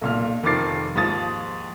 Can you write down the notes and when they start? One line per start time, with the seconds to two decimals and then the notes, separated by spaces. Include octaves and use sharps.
0.01 B1 A#2 F6
0.43 F1 D#3 F3 D6 A6 C7
0.95 D#2 G#2 F3 D#6 A6